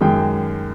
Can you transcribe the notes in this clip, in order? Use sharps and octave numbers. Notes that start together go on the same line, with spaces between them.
F#2 D#3 G#3 G5